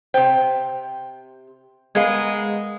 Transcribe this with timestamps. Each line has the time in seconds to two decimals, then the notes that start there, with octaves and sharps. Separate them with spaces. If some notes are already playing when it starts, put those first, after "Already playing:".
0.14 C3 C5 G5
1.95 G#3 B3 A#4 B4 F5 G#6